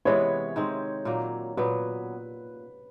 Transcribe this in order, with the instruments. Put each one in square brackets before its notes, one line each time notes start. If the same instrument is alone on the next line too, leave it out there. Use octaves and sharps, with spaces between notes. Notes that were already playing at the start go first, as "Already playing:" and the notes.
[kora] C3 E3 G#3 B3 [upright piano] C#5
[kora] D#3 G#3 C4
A#2 F#3 A#3
[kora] A#2 F#3 B3 [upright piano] B4